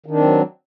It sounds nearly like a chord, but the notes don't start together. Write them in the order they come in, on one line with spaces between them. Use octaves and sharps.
D#3 D4 C4 F#3